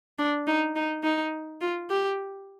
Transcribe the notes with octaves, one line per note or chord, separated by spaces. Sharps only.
D4
D#4
D#4
D#4
F4
G4